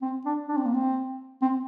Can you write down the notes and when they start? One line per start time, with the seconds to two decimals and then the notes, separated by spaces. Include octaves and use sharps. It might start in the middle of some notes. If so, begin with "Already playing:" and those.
0.02 C4
0.26 D4
0.48 D4
0.57 C4
0.65 A#3
0.74 C4
1.42 C4